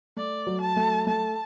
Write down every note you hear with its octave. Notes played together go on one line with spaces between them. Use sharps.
A3 D5
F#3
A5
A3
A3 A5